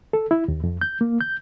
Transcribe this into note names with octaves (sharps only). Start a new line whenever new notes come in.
A4
E4
D#2
F2
G6
A#3
G6